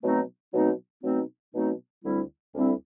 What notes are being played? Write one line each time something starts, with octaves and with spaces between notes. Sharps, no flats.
B2 F#3 A3 C4 D#4
B2 F#3 A3 C4 D#4
B2 F#3 A3 C4 D#4
B2 F#3 A3 C4 D#4
D2 D3 G3 C4 E4
D2 D3 G3 C4 E4